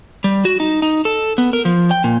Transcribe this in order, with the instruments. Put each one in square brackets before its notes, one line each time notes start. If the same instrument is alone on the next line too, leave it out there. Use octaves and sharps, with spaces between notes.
[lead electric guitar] G3
F#4
D#4
D#4
A4
B3
A#4
F3
G5
A#2